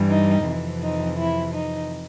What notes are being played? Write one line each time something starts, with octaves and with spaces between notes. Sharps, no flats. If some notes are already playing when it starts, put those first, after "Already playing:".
Already playing: G2 E3 G3
D#4
F2 C3 E3
D#4
E4
D#4